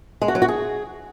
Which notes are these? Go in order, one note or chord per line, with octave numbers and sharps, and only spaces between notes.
G#3
F#4
F#3
F#4
G#4